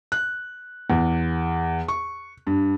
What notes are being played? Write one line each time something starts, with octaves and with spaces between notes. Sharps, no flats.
F#6
E2
C#6
G2